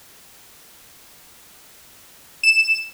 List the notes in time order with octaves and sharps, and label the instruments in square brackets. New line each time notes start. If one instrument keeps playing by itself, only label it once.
[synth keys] E7